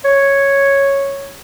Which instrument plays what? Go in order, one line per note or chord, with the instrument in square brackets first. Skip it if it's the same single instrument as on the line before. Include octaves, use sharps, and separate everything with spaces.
[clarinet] C#5